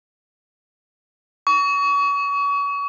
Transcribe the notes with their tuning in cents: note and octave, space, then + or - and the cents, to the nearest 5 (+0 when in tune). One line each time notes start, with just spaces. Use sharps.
C#6 +35